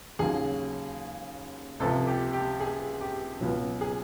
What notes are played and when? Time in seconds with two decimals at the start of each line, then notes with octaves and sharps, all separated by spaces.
0.19 D#2 C#3 F#3 G#4
1.80 C#2 C3 F3 A4
2.07 G4
2.33 G4
2.60 G#4
3.01 G4
3.41 C#2 B2 F#3
3.81 G#4